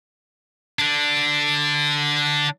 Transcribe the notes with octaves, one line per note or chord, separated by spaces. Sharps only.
D3 D4